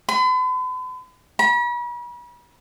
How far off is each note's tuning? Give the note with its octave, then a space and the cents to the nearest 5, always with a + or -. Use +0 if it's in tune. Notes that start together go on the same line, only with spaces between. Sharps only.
B5 +45
B5 -40